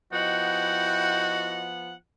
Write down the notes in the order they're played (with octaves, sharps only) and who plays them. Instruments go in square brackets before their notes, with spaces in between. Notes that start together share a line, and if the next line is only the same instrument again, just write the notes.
[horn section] F3 B3 F#5 [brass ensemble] E4 D#5 [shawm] F#4 [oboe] G5